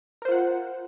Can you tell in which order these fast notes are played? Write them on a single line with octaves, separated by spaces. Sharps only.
A#4 C5 F4 F#5